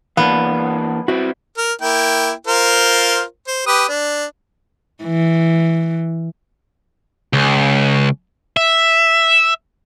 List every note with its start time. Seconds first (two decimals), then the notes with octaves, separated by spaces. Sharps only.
0.17 E3 A#3 B3 D4 F5
1.08 C4 E4 F#4
1.57 A#4
1.82 A#3 E4 G5
2.47 F4 A#4 C5
3.47 C5
3.66 G4 B4 D#6
3.88 D4
5.04 E3
7.33 C#2
8.57 E5